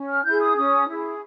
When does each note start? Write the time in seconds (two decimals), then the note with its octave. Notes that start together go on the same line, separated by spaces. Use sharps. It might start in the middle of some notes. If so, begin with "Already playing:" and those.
Already playing: C#4
0.09 F6
0.25 E4 G#4 G6
0.41 D#6
0.56 C#4 D#6
0.89 E4 G#4